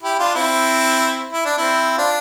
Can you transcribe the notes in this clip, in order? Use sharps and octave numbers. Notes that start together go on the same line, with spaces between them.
E4 G4
D4 F4
C4 E4
E4
D4
C4 E4
D4 F4